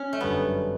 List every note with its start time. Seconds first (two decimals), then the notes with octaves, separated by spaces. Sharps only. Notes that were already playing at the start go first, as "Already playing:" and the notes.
Already playing: C#4
0.13 A3
0.21 G1 F#2 D3 G3 B3